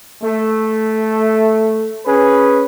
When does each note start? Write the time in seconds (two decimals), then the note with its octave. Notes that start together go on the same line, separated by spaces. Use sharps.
0.23 A3
2.06 C#4 G#4 B4